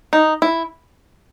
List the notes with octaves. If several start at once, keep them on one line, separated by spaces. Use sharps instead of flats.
D#4
E4